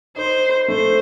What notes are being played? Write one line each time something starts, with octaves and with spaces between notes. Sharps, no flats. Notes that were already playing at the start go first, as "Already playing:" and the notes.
D#4 C5
A3 C5